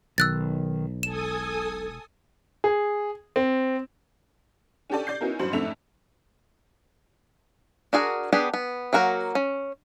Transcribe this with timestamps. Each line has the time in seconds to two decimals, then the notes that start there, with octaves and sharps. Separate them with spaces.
0.18 B1 D#3 E6 F#6 A6
1.03 E1 A4 G#5 D#6 E7
2.64 G#4
3.36 C4
4.90 C#4 D4 G4 A4 D5
5.07 D5 G6 C7
5.21 B3 C#4 D#4 E4 F#4 A#4
5.39 A1 G2 F#3 C5 C6 F#7
5.52 F2 G#2 A3 D4 E5 F7
7.93 D4 F#4 G#4 A#4
8.32 B3 D4 G4 G#4 B4
8.54 B3
8.93 F#3 A#3 F#4 A#4 F#5
9.35 C#4